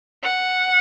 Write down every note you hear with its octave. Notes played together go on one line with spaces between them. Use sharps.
F#5